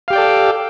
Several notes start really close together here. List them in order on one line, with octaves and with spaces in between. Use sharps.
F5 G4 G5 D5 A4